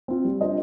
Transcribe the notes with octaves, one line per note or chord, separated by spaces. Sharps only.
C4 F4
G3
D4 F4 C5 D#5